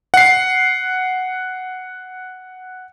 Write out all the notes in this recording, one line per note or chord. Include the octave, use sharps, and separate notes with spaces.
F#5 C7